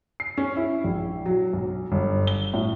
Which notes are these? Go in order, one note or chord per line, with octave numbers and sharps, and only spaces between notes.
C7
C#4
E4
A#1
F#3
B1
G1
G7
A2